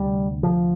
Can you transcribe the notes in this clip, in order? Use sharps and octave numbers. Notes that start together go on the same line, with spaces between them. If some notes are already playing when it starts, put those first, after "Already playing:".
Already playing: D2 C3 G3
F3